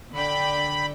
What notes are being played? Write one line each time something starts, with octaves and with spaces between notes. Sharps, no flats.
D3 D5 G5 B5